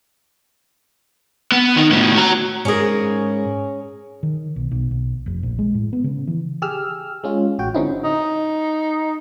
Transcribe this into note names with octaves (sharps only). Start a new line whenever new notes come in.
B3
D#3 D#4
A2 B3
F#4 A#5
G#2 C#4 G#4 A#4
D#3
B1
B1
B1
F1
A#1
G#3
A2
B3
C#3
E3
G4 G#4 E6 F6
G#3 C#4 F4
A1 F#4 G5
D3 C4 C#4 D#4 E4
D#4